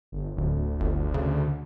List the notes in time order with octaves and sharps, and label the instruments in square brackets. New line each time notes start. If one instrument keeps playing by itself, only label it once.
[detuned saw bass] G1
[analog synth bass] D1 [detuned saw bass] D2
[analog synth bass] G1
C#3